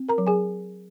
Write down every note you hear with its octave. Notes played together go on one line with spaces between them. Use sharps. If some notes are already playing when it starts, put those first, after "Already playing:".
Already playing: C4
A#4 A#5
F#3
G#4 G#5